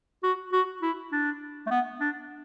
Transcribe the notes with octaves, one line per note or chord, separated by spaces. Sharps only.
F#4
F#4
E4
D4
A3
B3
D4